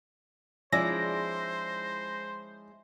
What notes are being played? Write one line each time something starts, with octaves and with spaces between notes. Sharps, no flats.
F3 G#3 C#4 D#4 E4 C5 D5 A#6